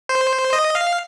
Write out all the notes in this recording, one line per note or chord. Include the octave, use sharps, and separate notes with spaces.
C5
D#5
F5